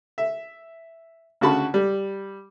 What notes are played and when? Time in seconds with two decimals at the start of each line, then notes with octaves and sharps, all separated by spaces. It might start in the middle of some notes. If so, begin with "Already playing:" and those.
0.18 E5
1.41 D2 C#3 F#4 A5 B5
1.74 G3